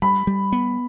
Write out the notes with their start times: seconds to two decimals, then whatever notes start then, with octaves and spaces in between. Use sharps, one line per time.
0.02 G3 B5
0.27 G3
0.52 B3